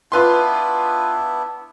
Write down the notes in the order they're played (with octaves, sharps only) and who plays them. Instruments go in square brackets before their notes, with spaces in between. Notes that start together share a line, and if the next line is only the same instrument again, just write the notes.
[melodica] B3 D4 E4 [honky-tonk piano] F4 B4 C6